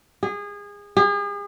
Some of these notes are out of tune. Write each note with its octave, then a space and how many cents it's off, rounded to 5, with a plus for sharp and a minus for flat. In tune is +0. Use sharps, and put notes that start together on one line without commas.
G#4 -25
G#4 -40